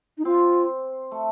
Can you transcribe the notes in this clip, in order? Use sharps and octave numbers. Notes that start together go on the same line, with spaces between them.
D#4
C4 F4
A3